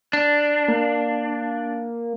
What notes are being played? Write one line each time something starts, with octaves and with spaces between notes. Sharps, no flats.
D4
A#3